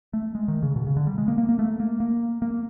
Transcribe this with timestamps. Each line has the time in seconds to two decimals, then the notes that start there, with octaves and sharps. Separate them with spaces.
0.13 A3
0.35 G#3
0.48 D#3
0.63 C#3
0.76 B2
0.87 C#3
0.97 D3
1.07 G3
1.18 G#3
1.28 A#3
1.38 A#3
1.49 A#3
1.59 A3
1.80 A#3
2.00 A#3
2.42 A#3